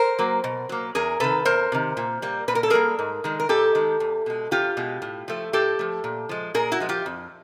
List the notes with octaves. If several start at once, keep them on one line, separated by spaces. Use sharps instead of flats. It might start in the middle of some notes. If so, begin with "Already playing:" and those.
Already playing: A#4 C5
F#3 A#3
B2
F#3 A#3
E2 G#4 A#4
C3 D#3 A4 B4
E2 A#4 C5
C3 D#3
A#2
G3 A#3
A#2 B4
A#4
A4
G3 A#3 G#4 A#4
G#2
D#3 G#3
A#4
G#2 G4 A4
D#3 G#3
E2
B2 G#3
E2 F4 G4
B2 G#3
A2
F3 A3
A2 G4 A4
F3 A3
A#2
F3 G#3
A#2 G#4 A#4
E4 F#4
F3 G#3
F4 G4
F2